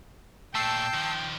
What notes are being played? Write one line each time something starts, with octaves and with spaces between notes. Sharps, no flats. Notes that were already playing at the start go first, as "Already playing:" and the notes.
A#2 A3 G5 A5 E6 C7
D#3 F3